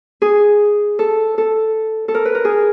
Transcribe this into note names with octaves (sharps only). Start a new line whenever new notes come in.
G#4
A4
A4
A4
A#4
B4
A#4
G#4